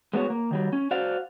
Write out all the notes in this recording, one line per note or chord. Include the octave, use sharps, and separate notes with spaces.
G#3 B3 F#4 C#5
A#3
D#3 F#3 G3
C#4
F#4 C5 D5 F5 F#5